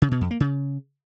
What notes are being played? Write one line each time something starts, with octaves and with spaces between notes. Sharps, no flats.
C#3
B2
F2
A#3
C#3